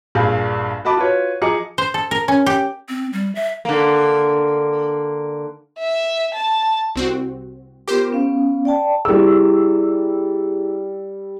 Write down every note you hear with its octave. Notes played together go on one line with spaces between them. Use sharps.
A#1 G2 G#4 F5 G6
F#4 D#5 A5 B5 D6
F4 F#4 B4 C#5
F3 G#4 D#5 A#5 D6 C#7
C5
A4
A#4
C#4
G4
C4
G3
E5
D3 A#3
E5
A5
C2 C4 F#4
B3 F4 G4 A#4 C5
B3 C#4 F5
D5 G5 A5
G3 E4 G#4 E6